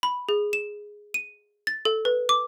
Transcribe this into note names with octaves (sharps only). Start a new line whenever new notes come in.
B5
G#4
E7
D#7
A6
A4
B4
D6